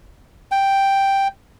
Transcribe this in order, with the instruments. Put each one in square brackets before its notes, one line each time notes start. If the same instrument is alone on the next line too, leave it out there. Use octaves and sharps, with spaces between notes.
[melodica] G5